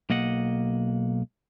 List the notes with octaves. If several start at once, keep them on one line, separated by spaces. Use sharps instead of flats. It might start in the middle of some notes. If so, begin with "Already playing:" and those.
B1 A#3 D#5 F#5